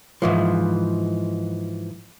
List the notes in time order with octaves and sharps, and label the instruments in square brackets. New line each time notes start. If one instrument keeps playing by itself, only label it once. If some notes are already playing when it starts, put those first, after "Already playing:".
[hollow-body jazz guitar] G#2 E3 F3